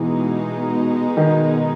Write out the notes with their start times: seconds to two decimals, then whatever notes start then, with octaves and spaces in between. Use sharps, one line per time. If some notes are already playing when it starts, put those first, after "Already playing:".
Already playing: B2 E3 G#3 D#4
1.17 D#3